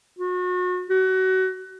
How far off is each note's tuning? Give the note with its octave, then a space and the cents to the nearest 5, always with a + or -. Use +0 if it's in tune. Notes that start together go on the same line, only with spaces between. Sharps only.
F#4 -35
F#4 +25